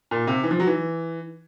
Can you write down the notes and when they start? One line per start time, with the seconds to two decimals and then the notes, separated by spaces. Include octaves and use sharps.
0.11 A#2
0.27 C3
0.43 E3
0.51 F3
0.60 F#3
0.67 E3